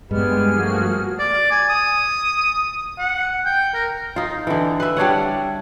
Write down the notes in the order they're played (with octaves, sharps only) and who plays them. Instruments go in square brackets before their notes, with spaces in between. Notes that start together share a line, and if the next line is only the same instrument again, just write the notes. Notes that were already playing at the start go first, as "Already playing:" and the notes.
[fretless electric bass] G2 G3 [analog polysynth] G#3 [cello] B3 [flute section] G4 G#4 F6
[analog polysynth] F3 F#4 [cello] A3 A#3
[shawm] D5
G#5
D#6
F#5
G5
A#4
[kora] D#4 F4
D3 E3
B4 E5
G3 D4 C#5 F#5